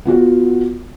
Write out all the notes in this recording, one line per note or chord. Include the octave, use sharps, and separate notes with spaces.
B3 F4 F#4